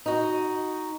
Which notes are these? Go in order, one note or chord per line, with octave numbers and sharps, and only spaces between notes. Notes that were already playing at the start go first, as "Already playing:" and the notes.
D#4 F#4